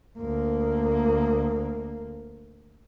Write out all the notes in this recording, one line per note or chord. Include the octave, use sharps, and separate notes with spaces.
D2 A#3